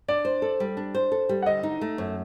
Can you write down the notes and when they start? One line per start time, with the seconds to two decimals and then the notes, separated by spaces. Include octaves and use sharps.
0.08 D4 D5
0.25 C5
0.42 A4
0.60 G3
0.77 D4
0.95 C5
1.12 A4
1.29 G3
1.42 F#5
1.46 D3 D#5
1.63 D#4
1.81 A3
1.98 F#2